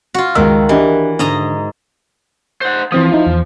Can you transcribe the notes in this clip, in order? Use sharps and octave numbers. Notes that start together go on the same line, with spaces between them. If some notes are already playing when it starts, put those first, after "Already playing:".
F4 F#4
C#2 D#3 G5 E6
E3 D4 G4 D#5
G#2 D3 D#5 A#5
C5 F#5
E3 F3 C4 D#6
D#4 E4
E2